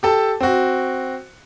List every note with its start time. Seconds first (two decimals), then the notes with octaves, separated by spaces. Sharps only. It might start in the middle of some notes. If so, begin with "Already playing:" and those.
0.03 G4 A4 A5
0.41 C4 F#4